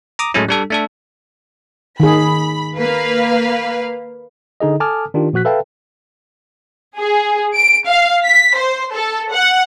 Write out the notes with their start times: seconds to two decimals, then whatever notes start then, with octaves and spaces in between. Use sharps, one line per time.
0.19 A#5 D6 D#6
0.34 A2 F#3 G#3 A3 C#4 E4
0.48 G3 D4 A4
0.70 A3 D4 A4
2.00 D#3 G#4 B5
2.78 A#3 B4 F5
4.60 D3 D#4 G#4 D#5
4.80 A4 G#5 A5 D6 D#6 F6
5.14 D#3 D4 F4 G4
5.33 A#2 F3 F#4 F#6 B6
5.45 A4 B4 E5 F5 G5 A5
6.98 G#4
7.55 D7
7.87 F5
8.24 B6
8.57 C5
8.93 A4
9.32 F#5